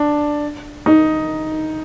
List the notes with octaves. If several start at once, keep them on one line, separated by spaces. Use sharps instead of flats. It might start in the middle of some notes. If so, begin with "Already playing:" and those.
Already playing: D4
D#4